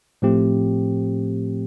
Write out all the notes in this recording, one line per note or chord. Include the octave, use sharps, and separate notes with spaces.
A2 F3 A3 C4 G4